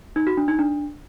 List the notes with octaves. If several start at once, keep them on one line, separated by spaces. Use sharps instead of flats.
D#4
F#4
D4
D#4
D4